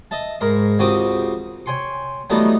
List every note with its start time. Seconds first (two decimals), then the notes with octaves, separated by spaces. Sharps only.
0.11 D#5 E5 A5
0.41 G#2 A#4 B5
0.79 C#2 C4 F#4 G4 D6 D#6
1.66 C#5 G5 G#5 C6 C#6
2.30 E3 F#3 G3 A3 B3 D#4